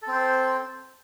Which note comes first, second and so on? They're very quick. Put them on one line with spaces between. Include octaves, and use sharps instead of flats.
A4 C4 C5